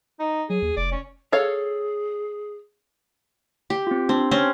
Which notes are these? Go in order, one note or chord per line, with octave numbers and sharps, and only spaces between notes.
D#4
F#3 G#4
D#2
F1 D5
C#4
G#4 A4 C#5 F5
G4
C4 F4
C4 D4
C4 C#4